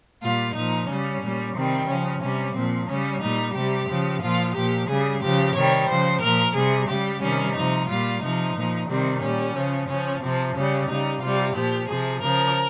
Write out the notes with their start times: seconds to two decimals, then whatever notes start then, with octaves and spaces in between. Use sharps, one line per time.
0.22 A#2 G3 F4
0.55 A#2 F3 D#4
0.89 C#3 G3 C#4
1.22 A#2 G3
1.55 C3 D#3 G3 C4
1.89 C#3 F3 C#4
2.22 C3 G3 C#4
2.56 A#2 F3 C4
2.89 C#3 G3 C#4
3.22 A#2 G3 D#4
3.56 C3 G3 G4
3.89 C#3 F3
4.22 A#2 F3 F4
4.55 A#2 F3 G4
4.89 C#3 G3 G#4
5.23 C#3 F3 G4
5.55 C3 D#3 G3 C#5
5.89 C#3 F3 C5
6.23 A#2 F3 A#4
6.56 C3 G3 G#4
6.89 C#3 G3 G4
7.22 C3 D#3 G3 C#4
7.56 C3 F3 D#4
7.89 A#2 G3 F4
8.22 C3 F3 D#4
8.56 A#2 F3
8.89 C3 D#3 G3 C4
9.22 A#2 G3 C#4
9.56 C#3 F3
9.89 C#3 F3 C#4
10.22 C3 F3 C4
10.56 C#3 G3 C#4
10.89 C#3 G3 D#4
11.22 C3 G3 F4
11.56 A#2 F3 G4
11.89 C3 F3 G#4
12.22 C#3 F3 A#4